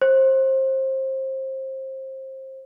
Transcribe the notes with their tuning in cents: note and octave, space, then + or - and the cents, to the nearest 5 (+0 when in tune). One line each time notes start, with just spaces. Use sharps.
C5 +25